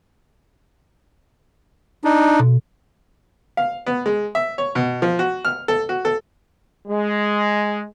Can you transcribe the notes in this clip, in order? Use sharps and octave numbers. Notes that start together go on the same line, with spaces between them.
D4 D#4
B2
F5
B3
G#3
E5
C#5
B2
F3
F#4
F6
A4
F#4
A4
G#3